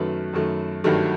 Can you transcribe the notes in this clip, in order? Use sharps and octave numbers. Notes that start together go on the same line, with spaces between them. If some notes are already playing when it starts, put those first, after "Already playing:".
Already playing: F#2 D#3 F#3 A3 B4
F#2 D#3 F#3 A3
G1 G2 D#3 F#3 A3